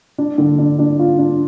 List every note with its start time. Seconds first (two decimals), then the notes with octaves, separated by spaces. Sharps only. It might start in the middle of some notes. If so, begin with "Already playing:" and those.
0.18 D4
0.38 D3
0.58 D4
0.79 D4
0.99 F4
1.19 D4